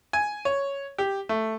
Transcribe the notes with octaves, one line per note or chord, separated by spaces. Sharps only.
G#5
C#5
G4
A3